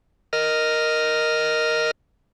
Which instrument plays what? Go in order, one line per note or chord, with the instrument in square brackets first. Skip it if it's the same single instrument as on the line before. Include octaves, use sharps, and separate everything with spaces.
[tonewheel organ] A#4 D#5 F6